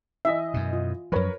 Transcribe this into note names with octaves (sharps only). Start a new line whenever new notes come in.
E3 D#5 E5
F#2 B2
F4
F#2 F3 A#4 B4 C#5